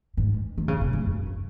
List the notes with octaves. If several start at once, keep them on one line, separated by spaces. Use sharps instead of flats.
G#2
D#3
C#3
C3
G#2
F#2